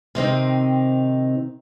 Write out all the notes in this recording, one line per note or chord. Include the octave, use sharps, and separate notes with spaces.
C3 D#3 C4 D#4